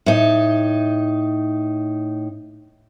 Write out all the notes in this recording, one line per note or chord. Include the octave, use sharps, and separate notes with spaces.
A2 D#4